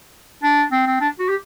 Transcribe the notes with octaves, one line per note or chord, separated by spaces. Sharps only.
D4
C4
C4
D4
F#4
G4